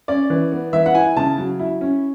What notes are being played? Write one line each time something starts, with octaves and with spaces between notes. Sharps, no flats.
C#4 D5
E3
B3
E3 E5
F#5
E4 G#5
C#3 A5
F#3
E4
C#4